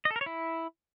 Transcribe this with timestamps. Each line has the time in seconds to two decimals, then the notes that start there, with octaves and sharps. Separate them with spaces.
0.05 D#5
0.11 A4
0.16 A#4
0.21 C#5
0.26 E4